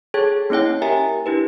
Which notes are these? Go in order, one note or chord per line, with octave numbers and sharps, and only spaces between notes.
G#4 A4 C#5 G5 A5 G#6
A#3 C#4 E4 C#5 G5
G4 A#4 E5 G5 G#5 A#5
D4 E4 G4 B4